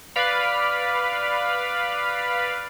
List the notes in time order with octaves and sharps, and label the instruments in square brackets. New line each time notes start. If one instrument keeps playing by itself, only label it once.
[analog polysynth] B4 D5 F5 B5